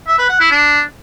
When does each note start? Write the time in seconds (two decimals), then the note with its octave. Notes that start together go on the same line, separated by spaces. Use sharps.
0.07 E5
0.18 B4
0.29 F#5
0.40 E4
0.51 D4